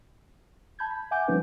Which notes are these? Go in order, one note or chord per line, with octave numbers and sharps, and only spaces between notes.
A5 B5 G6 G#6
B5
E5 F#5 G#5 D6 G6
F3 G3 A3 C#4 D#4 B4